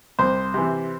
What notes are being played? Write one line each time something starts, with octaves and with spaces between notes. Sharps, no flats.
C2 C5
C3 E3